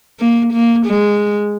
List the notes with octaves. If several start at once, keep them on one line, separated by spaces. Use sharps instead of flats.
A#3
A#3
G#3